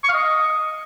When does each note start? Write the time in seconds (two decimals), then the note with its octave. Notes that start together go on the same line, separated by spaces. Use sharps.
0.04 C#6
0.09 F5
0.14 D#5